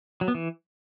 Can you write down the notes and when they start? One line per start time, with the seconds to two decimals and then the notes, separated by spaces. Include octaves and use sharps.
0.21 F#3
0.28 B3
0.35 E3